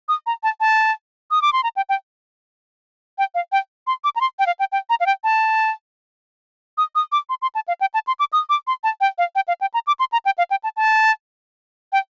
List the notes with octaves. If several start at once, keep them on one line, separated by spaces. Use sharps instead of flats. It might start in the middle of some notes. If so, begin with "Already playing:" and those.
D#6
A#5
A5
A5
D#6
D6
C6
A#5
G5
G5
G5
F5
G5
C6
D6
A#5
C6
G5
F5
G5
G5
A#5
F5
G5
A5
D#6
D#6
D6
C6
C6
A5
F5
G5
A5
C6
D6
D#6
D6
C6
A5
G5
F5
G5
F5
G5
A#5
D6
C6
A#5
G5
F5
G5
A5
A5
G5